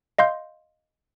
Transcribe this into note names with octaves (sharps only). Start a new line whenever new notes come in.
D#5 F5 C6 G6